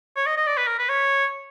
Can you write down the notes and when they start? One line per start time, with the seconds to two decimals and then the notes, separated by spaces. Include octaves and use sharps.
0.16 C#5
0.26 D#5
0.37 D#5
0.47 D5
0.57 B4
0.67 A#4
0.79 B4
0.89 C#5